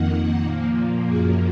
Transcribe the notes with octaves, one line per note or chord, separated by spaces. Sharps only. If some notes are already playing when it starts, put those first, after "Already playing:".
Already playing: F2 D#3 A#3 F#5
A#2 F3 A#3
F#2 F3 A#3 G#4